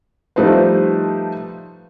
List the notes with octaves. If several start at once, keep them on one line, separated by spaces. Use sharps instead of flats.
F3 G3 A3 D#4 B4 C5